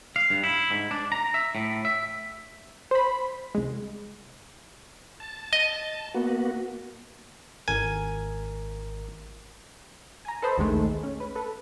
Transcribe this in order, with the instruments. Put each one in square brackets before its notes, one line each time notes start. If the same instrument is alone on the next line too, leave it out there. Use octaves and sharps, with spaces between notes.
[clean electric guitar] F5
G2
E4
G#2
D4
A#5
E5
A2
E5
[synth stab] C5 B5
C2 G#3
[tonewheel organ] A5
[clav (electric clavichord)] D#5
[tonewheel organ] A#3 B3 F#4
[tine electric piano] G#1 A#4 [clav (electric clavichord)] G#5
[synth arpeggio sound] G#5 A#5
A4 B4 C5 D#5 B5
A#1 D#2 D#3 G#3 A3
C#4
B4
A4 B4